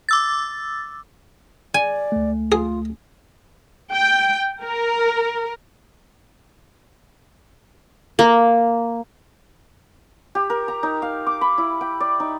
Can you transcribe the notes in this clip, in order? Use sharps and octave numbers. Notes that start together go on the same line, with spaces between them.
D6 E6 A6
D5 G#5
D2 A3
F4 G#4
G5
A#4
A#3
G4
A#4
A#5
D#4
F5
D6
B5
E4
G5
D5
D#4